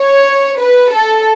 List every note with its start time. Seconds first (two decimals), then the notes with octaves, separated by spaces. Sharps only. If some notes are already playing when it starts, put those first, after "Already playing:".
Already playing: C#5
0.59 B4
0.93 A4